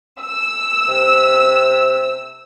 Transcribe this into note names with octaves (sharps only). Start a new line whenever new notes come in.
E6
C3